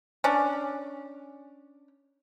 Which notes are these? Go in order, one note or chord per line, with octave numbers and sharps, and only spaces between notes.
C#4 D4